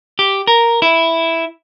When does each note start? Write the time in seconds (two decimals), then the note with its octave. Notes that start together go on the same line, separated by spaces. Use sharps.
0.19 G4
0.47 A#4
0.82 E4